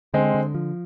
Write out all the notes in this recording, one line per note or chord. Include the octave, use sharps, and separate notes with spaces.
D3 G#3 C4
D3
F3